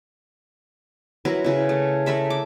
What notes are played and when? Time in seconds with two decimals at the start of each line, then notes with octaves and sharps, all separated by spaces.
1.25 F#3 E4 A#4 B4
1.44 C#3 E4
1.69 A3
2.06 A3 A#4 E5 B5
2.30 D6